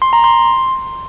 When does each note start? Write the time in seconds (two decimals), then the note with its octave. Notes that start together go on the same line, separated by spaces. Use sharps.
0.02 C6
0.13 A#5
0.24 C6